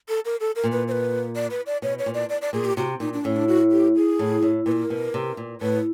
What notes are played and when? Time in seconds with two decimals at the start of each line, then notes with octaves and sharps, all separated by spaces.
0.09 A4
0.25 A#4
0.40 A4
0.56 A#4
0.64 A#2
0.72 B4
0.88 C5
0.92 B4
1.35 D5
1.50 B4
1.66 D5
1.82 B2 C#5
1.99 C#5
2.06 A#2
2.14 D5
2.29 D5
2.41 D5
2.53 A#2 G#4
2.65 G4
2.77 C3 F#4
3.00 A#2 D#4
3.13 D4
3.25 A2 C#4
3.36 D4
3.48 F#4
3.71 G4
3.96 G#4
4.19 A2
4.43 A2
4.66 A#2 B4
4.71 A#4
4.90 B2
5.14 C3
5.37 A#2
5.61 A2 B4